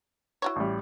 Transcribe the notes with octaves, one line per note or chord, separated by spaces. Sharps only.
E4 F#4 C#5
A1 G3